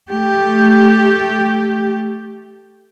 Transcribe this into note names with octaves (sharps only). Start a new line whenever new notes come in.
A3 G4